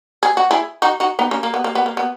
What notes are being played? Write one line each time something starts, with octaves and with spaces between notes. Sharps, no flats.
G#4
F#4
E4 G#4
D#4 F#4
D#4 F#4
B3 D#4
A#3 C#4
A#3
B3
A#3
B3
A#3
B3